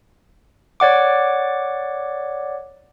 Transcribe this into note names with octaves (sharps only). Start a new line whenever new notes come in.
C#5 D5 F#5 D6